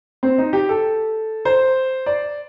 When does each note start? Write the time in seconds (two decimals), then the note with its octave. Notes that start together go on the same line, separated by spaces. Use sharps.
0.23 C4
0.38 D#4
0.53 G4
0.69 A4
1.45 C5
2.06 D5